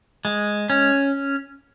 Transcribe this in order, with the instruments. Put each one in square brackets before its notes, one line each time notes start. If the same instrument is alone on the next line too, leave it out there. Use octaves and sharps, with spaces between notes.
[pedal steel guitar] G#3
C#4